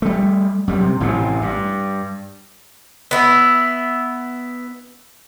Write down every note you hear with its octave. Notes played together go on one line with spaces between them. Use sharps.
G3 A3
F#2 G3
C3
A1 A2 C3
G2
B3 E4